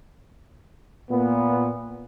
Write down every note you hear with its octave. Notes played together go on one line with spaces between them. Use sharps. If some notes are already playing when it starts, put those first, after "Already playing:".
A#2 B3